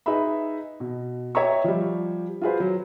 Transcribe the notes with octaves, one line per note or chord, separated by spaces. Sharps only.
D#4 G#4 B4 E5 B5
B2
C#5 D#5 E5 G5 A#5 C#6
F3 G3
F4 F#4 G#4 B4 C5
F#3